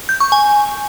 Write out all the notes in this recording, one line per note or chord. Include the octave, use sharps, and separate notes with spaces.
G6
C#6
G#5